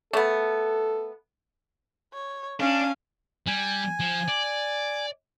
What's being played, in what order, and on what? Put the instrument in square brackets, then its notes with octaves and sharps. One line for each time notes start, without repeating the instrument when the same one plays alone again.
[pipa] A3 B3 [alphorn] A4
[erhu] C#5
[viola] C#4 [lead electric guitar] D4 [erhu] F5
[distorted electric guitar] G3 [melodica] G#5
[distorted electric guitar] F3
D5